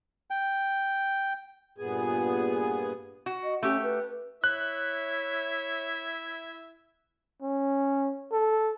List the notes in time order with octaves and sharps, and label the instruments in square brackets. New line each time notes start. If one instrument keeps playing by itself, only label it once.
[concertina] G5
[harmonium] G2 A#2 B3 G#4 G#5
[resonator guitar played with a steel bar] F#4
[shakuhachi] D#5
[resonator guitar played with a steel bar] A3 G4 [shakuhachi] C#4
[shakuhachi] B4
[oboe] E4 [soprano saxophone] C#5 [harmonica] E5 [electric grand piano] F#6
[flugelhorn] C#4
A4